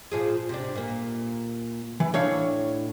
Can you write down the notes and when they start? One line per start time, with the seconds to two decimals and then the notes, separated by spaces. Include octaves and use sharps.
0.11 A#2 F3 G#4
0.49 C3 D4
0.76 A#2 A#3
2.00 E3
2.14 A2 D4 C#5 F5